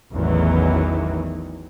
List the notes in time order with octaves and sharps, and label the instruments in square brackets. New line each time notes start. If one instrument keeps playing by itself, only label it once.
[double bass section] A1 E2 D#3 E3 F#3